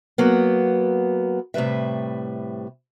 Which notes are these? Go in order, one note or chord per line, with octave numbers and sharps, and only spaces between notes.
F#3 A#3 B3
A2 C3 G3 B4 E5